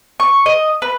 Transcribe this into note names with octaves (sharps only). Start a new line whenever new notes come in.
C#6
D#5
B4